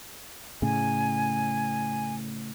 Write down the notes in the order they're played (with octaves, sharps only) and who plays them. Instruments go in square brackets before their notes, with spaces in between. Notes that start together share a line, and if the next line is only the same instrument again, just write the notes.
[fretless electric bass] A2 C#3 [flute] G#5